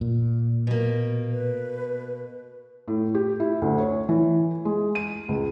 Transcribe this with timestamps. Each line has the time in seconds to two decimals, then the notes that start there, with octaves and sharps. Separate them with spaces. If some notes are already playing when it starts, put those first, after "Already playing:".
0.01 A#2
0.67 B2 A#3
1.32 B4
2.88 A2
3.15 G4
3.40 E4
3.62 D2
3.78 C#5
4.09 E3
4.65 G#3
4.95 D#7
5.28 C#2